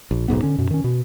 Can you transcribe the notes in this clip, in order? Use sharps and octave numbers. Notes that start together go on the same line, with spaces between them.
A#1
D#1 B1 G#2 B3
D3 C#4
F#2 B2
D#3 C#4
B2